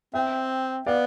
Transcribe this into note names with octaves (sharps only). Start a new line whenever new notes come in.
C4 E5 G5
B3 D5 F5